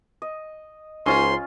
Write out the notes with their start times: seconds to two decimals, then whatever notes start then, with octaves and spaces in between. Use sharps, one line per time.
0.22 D#5
1.06 C#2 C#4 D#4 F4 C5 C#5 C6